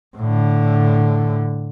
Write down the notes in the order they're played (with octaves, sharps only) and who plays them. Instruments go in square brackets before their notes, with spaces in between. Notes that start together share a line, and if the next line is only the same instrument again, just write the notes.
[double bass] A2 D3